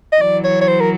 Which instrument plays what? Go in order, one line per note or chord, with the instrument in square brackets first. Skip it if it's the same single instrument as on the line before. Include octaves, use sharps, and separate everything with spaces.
[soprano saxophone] D#5
[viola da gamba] E3 F#3 [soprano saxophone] D5
[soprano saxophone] C#5
C#5
C5
A#4